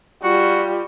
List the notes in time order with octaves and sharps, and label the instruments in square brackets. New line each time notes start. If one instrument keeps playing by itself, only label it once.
[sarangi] G3 [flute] F4 [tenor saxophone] F#4